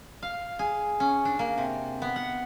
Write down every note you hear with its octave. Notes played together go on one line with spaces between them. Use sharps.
F5
G#4
C#4
D4
A#3
C3
B3
F#5